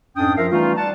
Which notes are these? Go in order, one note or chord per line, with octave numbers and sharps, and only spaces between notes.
F2 G#2 C#4 D4 G5 D#6
F#2 F3 F4 A#4 E5 F5
E3 G3 A3 C#4 D#4 F4
G3 F#5 A5